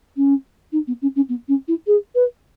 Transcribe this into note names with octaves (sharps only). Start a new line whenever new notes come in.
C#4
D#4
B3
C#4
C#4
B3
C#4
E4
G#4
B4